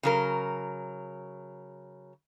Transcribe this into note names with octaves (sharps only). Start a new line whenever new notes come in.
C#3 F#3 A#4